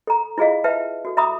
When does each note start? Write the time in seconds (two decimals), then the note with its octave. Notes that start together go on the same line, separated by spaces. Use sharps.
0.07 A4 A#5
0.38 E4 F4 G#4 D#5 F5
0.64 B4 E5 G5 A5
1.05 F#4 A4
1.17 E5 A#5 B5 D6 D#6